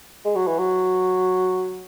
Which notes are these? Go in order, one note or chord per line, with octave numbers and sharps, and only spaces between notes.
G#3
F#3
E3
F#3